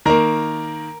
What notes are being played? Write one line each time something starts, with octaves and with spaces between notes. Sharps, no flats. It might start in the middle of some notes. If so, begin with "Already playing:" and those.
D#3 A#3 A#4 A#5